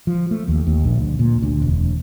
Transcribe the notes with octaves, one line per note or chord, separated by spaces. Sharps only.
F3
A3
D#2
D#2
A#1
D2
A#2
D2
E1